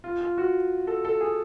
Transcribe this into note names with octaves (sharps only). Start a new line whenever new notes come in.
F4
F4
F#4
A4
A4
G#4